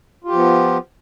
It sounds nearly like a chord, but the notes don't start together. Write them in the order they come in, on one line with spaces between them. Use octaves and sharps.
F4 G4 F3 B3